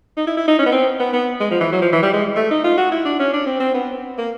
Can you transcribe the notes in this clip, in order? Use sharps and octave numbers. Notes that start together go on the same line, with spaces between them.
D#4
E4
E4
D#4
C#4
B3
C4
B3
B3
G#3
F3
E3
F#3
F3
E3
G3
G#3
A3
D#4
F4
F#4
E4
D4
C#4
D4
C4
C4
B3
A#3